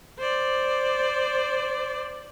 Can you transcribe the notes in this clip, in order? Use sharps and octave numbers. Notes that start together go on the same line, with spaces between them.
C5 D5